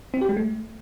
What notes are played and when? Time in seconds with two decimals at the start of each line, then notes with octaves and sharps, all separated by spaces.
0.14 C4
0.21 G4
0.29 G#3
0.37 A3